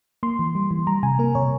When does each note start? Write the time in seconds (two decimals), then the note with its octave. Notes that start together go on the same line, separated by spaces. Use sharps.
0.23 A#3 C6
0.39 E3
0.55 G3
0.71 E3
0.87 G3 A#5
1.03 C3 G#5
1.19 A#3 A#4
1.35 C3 C#5